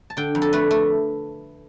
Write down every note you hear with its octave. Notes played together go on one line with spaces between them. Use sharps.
A5
D3 G5
F2
A4
A3 B4
A3